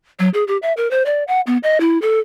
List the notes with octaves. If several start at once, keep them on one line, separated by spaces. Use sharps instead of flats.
F#3
G#4
G4
E5
A#4
C5
D5
F#5
B3
D#5
E4
A4